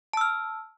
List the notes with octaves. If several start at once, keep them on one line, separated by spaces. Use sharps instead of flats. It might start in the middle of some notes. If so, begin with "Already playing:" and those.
A5 E6 F6